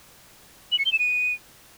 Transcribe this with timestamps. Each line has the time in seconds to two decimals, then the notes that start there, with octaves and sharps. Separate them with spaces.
0.72 F#7
0.79 C#7
0.85 G7
0.92 E7
0.99 D#7